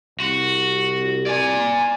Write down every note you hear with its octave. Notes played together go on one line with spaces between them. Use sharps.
C2 F#4
D5 G#5